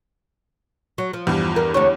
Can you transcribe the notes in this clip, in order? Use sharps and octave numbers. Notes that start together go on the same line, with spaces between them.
F#3
F3
E2 G2
A#4
D2 D4 C#5